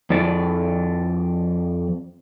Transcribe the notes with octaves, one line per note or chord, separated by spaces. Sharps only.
F2 D5